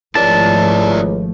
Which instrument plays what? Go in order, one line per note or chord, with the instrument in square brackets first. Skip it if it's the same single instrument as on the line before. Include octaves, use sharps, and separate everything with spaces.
[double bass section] G#1 F3 A3 [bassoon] C#2 [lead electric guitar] E4 D5 [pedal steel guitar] A5